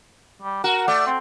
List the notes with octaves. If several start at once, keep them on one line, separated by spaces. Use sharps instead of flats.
G3
F#4 A#4
A3 D5
C4